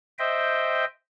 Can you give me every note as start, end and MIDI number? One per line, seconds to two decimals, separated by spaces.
0.19 0.85 72
0.19 0.85 75
0.19 0.85 76
0.19 0.85 79